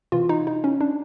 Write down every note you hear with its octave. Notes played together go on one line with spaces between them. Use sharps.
C3 E3 F4
D#4
D#4
C#4
D4